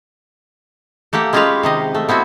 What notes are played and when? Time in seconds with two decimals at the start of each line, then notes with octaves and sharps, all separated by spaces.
1.13 A3 A#3 G4 F#5
1.33 G#3 C#4 F4 G4 B4 F5
1.63 C3 D#3 D#5
1.95 A3
2.09 B3 C4 E4 F#4